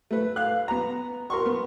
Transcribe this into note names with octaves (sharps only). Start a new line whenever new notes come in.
A3 B4
F5 F#6
B3 A#5
A#4 C6 C#6
B3